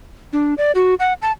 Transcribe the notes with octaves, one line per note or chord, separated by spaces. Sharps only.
D4
D5
F#4
F#5
A5